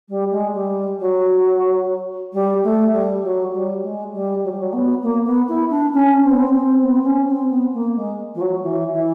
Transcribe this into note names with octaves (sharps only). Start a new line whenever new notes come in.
G3
G#3
G3
F#3
G3
A3
G3
F#3
G3
G#3
G3
F#3
G3
F#3
B3
A#3
B3
E4
D4
C#4
C4
B3
C4
C4
B3
C4
C#4
C4
B3
A#3
G#3
F3
F#3
E3
E3